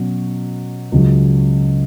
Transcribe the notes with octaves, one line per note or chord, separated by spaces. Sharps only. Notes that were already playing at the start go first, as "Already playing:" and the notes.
Already playing: B2 F#3 C#4
C#2 C#3 F#3 C#4